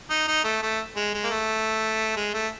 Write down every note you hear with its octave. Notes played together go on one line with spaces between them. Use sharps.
D#4
D#4
A3
A3
G#3
G#3
A#3
A3
G#3
A3